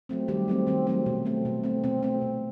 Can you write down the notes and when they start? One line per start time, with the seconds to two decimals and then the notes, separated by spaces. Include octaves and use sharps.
0.09 F#3 A3 C4
0.28 D#3 G3 G4
0.48 F#3 A3 C4
0.67 D#3 C4
0.87 F#3 A3 C4
1.06 B2
1.25 A3 C4
1.45 B2
1.63 A3 C4
1.84 B2 C4
2.03 A3 C4
2.21 B2